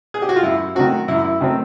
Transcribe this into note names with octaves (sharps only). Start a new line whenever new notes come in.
G#4
G4
F#4
F4
F#2 E4
D#3 F#3 A3 C4 F#4
F#2 E4
E4
D#3 F#3 A3 C4